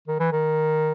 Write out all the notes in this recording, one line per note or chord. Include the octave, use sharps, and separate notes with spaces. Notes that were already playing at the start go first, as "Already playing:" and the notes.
D#3
E3
D#3